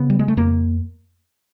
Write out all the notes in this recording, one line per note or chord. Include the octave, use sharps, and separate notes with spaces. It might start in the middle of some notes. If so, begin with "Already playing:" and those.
Already playing: C#3 B3
G3
G#3
A3
F2 A#3